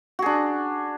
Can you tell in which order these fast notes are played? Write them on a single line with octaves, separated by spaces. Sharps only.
F#4 G#4 D4